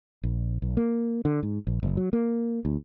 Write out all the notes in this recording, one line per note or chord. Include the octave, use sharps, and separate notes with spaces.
A#1
B1
A#3
D3
G#2
A#1
F#1
F#3
A#3
D2